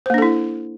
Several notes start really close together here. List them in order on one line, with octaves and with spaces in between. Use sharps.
C5 A#3 D4 A4 E4